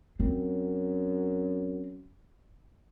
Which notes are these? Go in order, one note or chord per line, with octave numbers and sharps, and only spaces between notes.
F#2 C4